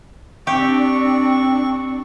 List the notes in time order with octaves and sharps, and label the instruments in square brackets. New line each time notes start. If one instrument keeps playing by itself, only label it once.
[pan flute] C4 [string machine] D4 [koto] G4 [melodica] C#6